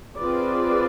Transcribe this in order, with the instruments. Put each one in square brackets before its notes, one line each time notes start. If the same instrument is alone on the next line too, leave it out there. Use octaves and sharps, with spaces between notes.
[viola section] C4 F4 G#4 B4 D5